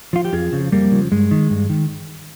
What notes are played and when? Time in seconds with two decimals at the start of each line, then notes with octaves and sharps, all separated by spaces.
0.13 F3 F4
0.25 G4
0.33 F2 F4 G#4
0.52 C#3 F3
0.72 F2 G3 A#3
0.92 C#3 F3
1.12 G2 G#3
1.31 D#3
1.50 G2
1.69 D#3